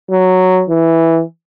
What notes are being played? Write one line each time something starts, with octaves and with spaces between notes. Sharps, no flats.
F#3
E3